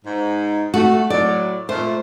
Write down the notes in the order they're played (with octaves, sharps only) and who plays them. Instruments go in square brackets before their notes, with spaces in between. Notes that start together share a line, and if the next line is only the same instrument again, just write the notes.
[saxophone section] G#2
[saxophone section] A3 [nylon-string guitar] F#4
[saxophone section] A2 F#3 [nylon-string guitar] D5
[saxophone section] A#2 A3 [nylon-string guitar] C5